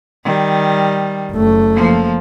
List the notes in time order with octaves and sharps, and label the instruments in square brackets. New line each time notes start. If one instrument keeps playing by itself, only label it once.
[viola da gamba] D#3 G3
[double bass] F#1 A3
[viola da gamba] F3 A#3